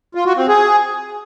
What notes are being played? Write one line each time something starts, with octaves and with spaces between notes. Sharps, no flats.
F4
F#4
C4
G#4